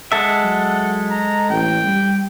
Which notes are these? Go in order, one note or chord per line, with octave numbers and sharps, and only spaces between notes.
G#3 A4 E5 F#5
F#3
A#5
A1 G5
G3